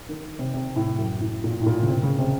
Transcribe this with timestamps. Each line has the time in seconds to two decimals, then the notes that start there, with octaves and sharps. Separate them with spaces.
0.09 D#3
0.39 C3
0.54 C3
0.76 A2
0.99 F#2
1.21 A2
1.44 A#2
1.62 A2
1.66 A#2
1.82 C#3
1.88 C3
2.03 C#3
2.19 C3